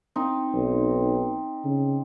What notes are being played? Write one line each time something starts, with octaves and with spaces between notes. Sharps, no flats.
C4 D#4
B1
C#3